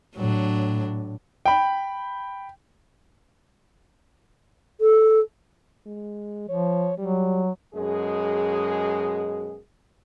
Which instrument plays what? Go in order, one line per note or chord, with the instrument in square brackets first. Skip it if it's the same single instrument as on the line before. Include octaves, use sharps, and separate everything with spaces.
[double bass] A2 [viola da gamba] F#3 D4
[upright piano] G5 B5
[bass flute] A4
[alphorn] G#3
[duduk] F3 [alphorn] C#5
[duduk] F#3 [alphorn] G3
[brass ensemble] F#2 B2 G#3 G#4